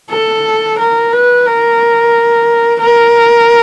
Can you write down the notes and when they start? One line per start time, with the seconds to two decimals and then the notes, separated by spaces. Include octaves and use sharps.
0.10 A4
0.78 A#4
1.12 B4
1.46 A#4
2.80 A#4